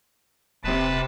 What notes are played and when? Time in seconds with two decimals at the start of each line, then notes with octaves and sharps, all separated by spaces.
0.64 D#1 C3 B4 A5